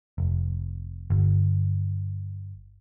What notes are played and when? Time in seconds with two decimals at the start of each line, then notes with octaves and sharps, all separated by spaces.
0.18 F1
1.10 G1